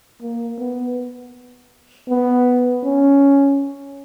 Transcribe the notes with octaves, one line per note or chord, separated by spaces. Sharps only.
A#3
B3
B3
C#4